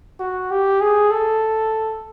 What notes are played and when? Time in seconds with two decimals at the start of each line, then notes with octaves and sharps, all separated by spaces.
0.20 F#4
0.51 G4
0.81 G#4
1.11 A4